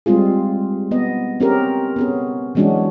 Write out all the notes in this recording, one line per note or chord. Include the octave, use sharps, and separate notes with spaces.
G3 G#3 C4 F4 G#4
B3 D#5
C4 C#4 G4 G#4 A#4
B3 C#4 G#4
E3 F#3 G#3 C#4 D4 F#4